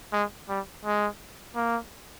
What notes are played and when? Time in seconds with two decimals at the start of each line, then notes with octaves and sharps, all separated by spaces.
0.12 G#3
0.49 G3
0.85 G#3
1.56 A#3